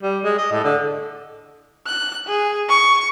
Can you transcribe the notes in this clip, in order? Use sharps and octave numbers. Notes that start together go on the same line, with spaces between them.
G3
G#3
D#5
A2
D3
F#6
G#4
C#6